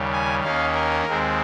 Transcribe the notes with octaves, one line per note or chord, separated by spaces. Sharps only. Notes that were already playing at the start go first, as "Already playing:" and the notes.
Already playing: D#2 C#3 G3
G#5
D#2 D#3 A#3 C#4 F5
A#4
D#2 D#3 G#3 C4